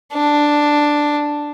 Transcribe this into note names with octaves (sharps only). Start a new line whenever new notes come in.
D4